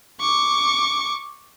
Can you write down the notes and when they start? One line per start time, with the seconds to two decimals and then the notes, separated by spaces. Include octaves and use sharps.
0.20 C#6 D6